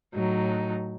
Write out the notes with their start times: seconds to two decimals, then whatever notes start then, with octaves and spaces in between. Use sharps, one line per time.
0.14 A2 F#3 D#4